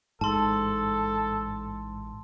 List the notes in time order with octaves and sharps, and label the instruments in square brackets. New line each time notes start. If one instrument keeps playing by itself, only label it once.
[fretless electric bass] A1 G#2 [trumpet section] A4 [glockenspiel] A5 C6